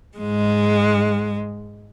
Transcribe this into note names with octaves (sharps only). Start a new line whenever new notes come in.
G#2 G#3